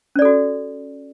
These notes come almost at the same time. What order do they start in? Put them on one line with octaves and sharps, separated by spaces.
C#4 D5 A4 F#4